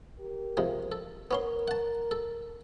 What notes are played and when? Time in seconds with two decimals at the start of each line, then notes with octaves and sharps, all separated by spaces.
0.20 G4 A#4
0.57 C3 F3 G#3
0.92 A4
1.31 B3 C#4 A#4 C6
1.68 F#5 A5
2.11 A4